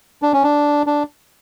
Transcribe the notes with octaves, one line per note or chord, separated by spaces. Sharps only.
D4
C#4
D4
D4